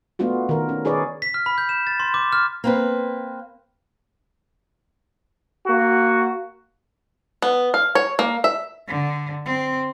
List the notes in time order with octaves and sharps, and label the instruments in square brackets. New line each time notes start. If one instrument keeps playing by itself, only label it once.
[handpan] A3 B3 D4 F4 F#4
D#3 A#4
C#4
D#4 G#4 B4 C#5 D5
[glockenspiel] B6
F6
B5
G6
E7
A6
C6
D6
F6
[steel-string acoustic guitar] A#3 C4 B4
[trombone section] A#3 F#4
[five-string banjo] B3
F5
C#5
A#3
E5
[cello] D3
C4